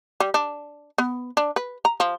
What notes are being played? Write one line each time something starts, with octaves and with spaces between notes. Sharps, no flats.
G3
D4
B3
D4
B4
A#5
F3